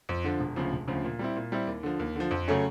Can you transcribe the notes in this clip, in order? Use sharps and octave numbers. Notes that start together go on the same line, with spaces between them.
F2
D3 F3
E1
D2 C#3 F3
E1
D2 C#3 F3
A#2
G3 C4 E4
A#2
G3 C4 E4
D#2
D3 F3
D#2
D3 F3
F2
C#3 F#3 A3 C#4